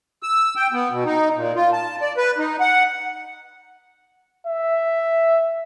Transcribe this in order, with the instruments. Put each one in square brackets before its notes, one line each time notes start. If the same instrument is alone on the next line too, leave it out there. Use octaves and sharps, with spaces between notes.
[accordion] E6
G5
B3
B2
D#4
A#2
F4
A5
D5
B4
D#4
F#5
[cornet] E5